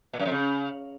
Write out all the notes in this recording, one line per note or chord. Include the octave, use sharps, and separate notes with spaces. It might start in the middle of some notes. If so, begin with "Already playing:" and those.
A#2
F#2
F2
C#3